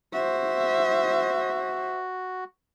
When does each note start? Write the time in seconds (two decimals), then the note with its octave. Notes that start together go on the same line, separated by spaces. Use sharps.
0.13 F#4 C5 E5